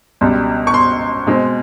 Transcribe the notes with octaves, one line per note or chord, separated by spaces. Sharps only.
C#2 B2 G3
C#6
C6
B2 G#3 C4